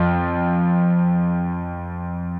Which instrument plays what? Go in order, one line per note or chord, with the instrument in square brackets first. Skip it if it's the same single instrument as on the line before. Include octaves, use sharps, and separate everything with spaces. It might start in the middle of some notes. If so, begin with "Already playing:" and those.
Already playing: [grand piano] F2 F3